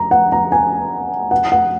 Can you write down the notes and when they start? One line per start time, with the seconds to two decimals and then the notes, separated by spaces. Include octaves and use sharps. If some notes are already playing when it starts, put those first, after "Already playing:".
Already playing: A#5
0.11 F#5
0.32 A#5
0.52 G#5
1.31 F#5
1.52 F#5